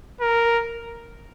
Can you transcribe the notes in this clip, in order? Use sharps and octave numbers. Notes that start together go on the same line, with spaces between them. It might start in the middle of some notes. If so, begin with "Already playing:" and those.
A#4